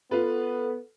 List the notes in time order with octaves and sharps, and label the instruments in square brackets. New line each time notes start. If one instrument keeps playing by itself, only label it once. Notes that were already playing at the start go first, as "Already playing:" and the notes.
[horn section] B3 [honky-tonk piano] F4 B4 [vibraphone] A4